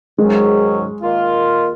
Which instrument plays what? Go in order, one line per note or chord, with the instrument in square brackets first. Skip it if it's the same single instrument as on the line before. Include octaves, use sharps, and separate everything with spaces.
[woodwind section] G#2 D#3 F#3 C#4 [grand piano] G#3
[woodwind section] D#3 A#3 F4